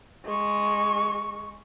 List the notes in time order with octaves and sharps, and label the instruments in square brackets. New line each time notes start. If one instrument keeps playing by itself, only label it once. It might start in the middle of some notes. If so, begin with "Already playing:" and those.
[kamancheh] G#3 C#6